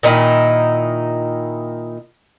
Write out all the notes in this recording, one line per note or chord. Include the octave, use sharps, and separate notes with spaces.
A#2 D#3 D#4 E4